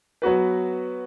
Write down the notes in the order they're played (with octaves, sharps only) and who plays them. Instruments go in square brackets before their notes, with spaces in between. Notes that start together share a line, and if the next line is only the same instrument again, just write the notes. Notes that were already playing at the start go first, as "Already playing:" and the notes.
[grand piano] F#3 B3 F#4 B4